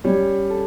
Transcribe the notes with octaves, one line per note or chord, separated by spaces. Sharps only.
G3 C#4
A4